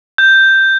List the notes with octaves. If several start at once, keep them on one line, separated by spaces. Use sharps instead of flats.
G6